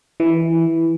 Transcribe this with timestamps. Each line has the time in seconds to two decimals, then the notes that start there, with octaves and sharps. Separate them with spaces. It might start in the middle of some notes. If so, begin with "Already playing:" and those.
0.20 E3